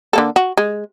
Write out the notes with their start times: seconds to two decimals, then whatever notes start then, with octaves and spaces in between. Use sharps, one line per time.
0.13 D3 A#3 A4
0.36 F#4
0.57 G#3